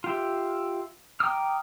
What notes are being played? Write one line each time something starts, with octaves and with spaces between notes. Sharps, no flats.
F4 G4 E5
G5 A#5 D6 D#6 F6